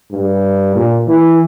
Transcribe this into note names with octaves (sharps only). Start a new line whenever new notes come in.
G2
A#2
E3